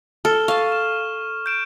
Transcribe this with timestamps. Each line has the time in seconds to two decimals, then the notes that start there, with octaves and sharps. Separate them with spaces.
0.25 A4 F6
0.48 F5 A5 C#6
0.72 E7
1.46 G6 D7 E7